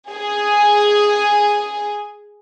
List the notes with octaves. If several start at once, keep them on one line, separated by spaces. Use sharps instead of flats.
G#4 G#5